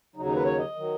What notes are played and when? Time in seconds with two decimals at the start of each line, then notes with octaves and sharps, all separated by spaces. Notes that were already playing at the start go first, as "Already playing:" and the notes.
0.15 D#2 C#3 F#3 D#4
0.25 D#4
0.35 B4
0.44 C#5
0.58 D#5
0.75 D#3 F#3